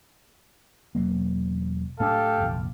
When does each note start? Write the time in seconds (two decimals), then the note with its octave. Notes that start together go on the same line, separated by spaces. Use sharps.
0.95 E1 F#3 A#3
2.00 A2 A3 D4 G4 A4 F5
2.40 F1 A#1